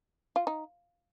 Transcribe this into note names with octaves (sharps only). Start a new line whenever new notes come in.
F4
D#4